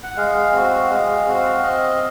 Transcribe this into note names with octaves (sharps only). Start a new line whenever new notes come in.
F#5
G#3 F5
C4 F#4
G#3
C4 F#4
C4 D#5